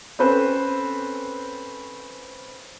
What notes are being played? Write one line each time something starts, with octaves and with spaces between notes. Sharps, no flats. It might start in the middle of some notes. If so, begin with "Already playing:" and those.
C4 C#4 A4 B4 C5